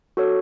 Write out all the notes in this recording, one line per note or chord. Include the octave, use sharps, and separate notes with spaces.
F#4 A4 C#5